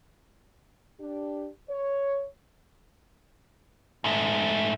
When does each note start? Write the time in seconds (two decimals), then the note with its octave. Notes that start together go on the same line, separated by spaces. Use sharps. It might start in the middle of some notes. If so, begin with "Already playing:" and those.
1.00 D4 G4
1.70 C#5
4.04 G#2 A3